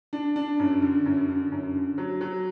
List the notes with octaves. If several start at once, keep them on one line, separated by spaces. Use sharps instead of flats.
D4
D4
F#2
D3
F#2
D3
F#2
D3
F#3
F#3